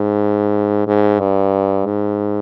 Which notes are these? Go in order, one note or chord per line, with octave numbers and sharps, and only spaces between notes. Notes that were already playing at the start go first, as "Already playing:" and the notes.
Already playing: G#2
G#2
G2
G#2